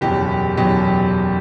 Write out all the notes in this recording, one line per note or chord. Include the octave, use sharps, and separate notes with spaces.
F#1 E2 B2 F#3 G4
F#1 E2 B2 F#3 G4